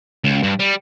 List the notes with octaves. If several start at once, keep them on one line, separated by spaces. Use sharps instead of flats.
C#2
G2
G3